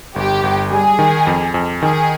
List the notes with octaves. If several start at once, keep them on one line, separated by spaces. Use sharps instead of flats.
G1 G4
G1
G3 G#4
D#3
F2
F2
D#3 G#4